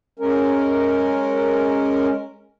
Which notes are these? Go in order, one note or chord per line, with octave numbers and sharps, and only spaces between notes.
G#3 C#4 A#4